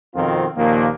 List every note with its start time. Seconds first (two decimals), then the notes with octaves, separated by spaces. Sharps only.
0.15 F2 B2 D#3 C4 F4
0.56 D#2 A#2 F3 A#3